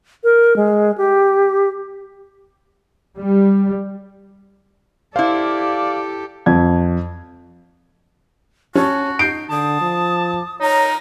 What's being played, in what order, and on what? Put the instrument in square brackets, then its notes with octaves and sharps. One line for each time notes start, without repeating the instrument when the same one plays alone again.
[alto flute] A#4
G#3
G4
[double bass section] G3
[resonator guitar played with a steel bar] E4 C5 [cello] G4 A4 [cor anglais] D5 [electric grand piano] F5
[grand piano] F2 G#6
[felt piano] C#4 [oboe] F#4 [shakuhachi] A5
[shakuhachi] D#4 [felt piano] G6 C7 D7
[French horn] D3 [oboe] A5 [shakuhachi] D#6
[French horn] F3
[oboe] D#4 [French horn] C#5 [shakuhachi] A#5